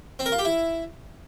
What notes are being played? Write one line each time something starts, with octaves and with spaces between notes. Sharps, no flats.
C4
A#4
F4
G4
E4